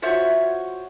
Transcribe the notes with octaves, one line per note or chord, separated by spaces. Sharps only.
F4 F#4 C5 C#5 E5 F#5